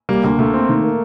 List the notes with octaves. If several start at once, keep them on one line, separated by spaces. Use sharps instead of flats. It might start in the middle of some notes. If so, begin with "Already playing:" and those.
G3 A#3
D2 A#3
D2 A3
C4
D#3
A#3